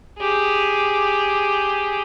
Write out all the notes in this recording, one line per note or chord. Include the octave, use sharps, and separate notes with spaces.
G4 G#4